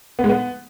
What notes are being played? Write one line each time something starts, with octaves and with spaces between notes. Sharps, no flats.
B3
G#3
B3